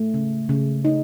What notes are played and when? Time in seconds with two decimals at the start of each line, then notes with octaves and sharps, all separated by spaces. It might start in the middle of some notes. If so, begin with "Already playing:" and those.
Already playing: A3
0.14 C#3
0.49 C#3
0.85 D#4